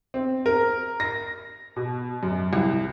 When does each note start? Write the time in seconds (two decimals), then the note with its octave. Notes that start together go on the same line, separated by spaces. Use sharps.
0.14 C4
0.46 A#4
1.00 A#6
1.76 B2
2.23 F#2
2.53 C2